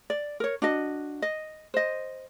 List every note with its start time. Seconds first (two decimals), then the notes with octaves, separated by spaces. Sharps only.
0.10 D5
0.40 A#4 C#5
0.62 D4 F#4 D#5
1.22 D#5
1.74 C5 D#5